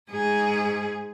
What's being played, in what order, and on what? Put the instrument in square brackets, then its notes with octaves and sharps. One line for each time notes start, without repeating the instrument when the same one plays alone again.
[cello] G#2 G#4